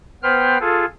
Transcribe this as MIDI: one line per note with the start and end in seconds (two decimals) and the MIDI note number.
0.23 0.58 59
0.23 0.58 71
0.23 0.58 72
0.23 0.58 79
0.23 0.58 89
0.60 0.85 65
0.60 0.85 68
0.60 0.85 69